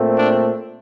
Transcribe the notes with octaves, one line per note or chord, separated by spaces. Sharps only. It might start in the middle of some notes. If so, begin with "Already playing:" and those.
Already playing: A#2 A3 C4
D4